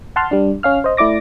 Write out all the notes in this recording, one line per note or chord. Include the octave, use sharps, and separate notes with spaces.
F#5 A5 C6 F6
G3 D4
C#4 F5 F6
C5 D#5
A3 E4 D5 D6 A#6